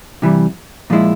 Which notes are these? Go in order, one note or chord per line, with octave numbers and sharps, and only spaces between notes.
C3 E3 G3
A#2 F3 G#3 E4